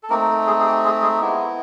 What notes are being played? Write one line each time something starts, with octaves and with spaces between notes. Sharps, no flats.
A4
A3 A#3 C4 D#4 A#4
G#3 G#4
G#4
G4
G#3 G#4
G#3 G#4
G#3 B3 E4 G4